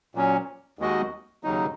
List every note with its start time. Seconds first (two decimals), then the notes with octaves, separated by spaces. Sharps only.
0.15 A#2 F#3 C#4
0.79 D#2 D#3 G#3 F#4 D#5
1.43 D#2 C#3 F#3 D#4